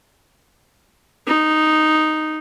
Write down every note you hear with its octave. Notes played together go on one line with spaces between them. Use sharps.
D#4